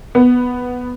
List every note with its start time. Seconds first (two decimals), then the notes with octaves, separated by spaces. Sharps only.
0.15 B3